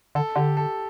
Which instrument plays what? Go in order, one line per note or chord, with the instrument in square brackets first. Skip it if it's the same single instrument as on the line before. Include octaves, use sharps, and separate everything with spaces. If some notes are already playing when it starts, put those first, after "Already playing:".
[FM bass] D3 [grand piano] A4
[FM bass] D3 [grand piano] G4
[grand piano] A4